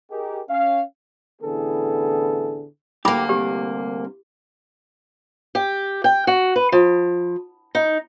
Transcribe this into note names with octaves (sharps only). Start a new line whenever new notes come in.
D#4 G4 G#4 A#4
C#4 F5
A1 D3 B3 E4 G#4 A4
D2 A#3 E4 G4 B5 D6
G2 C3 G4
G4
G5
F#4
B4
F3
D#4